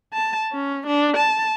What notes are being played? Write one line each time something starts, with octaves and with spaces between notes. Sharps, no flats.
A5
C#4
D4
A5